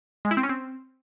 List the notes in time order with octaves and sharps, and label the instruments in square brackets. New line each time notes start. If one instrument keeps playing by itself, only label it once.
[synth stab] G#3
E4
C4
C#4
C4